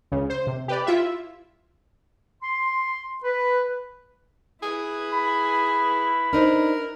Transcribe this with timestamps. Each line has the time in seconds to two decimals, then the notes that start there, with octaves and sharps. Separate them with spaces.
0.12 C#2 C#3
0.30 C5
0.47 C3
0.68 G4 B4 D5
0.87 E4 F4 E5
2.43 C6
3.24 B4
4.63 E4 G#4 B4
5.12 B5
6.33 D4 D#4 A#4 C5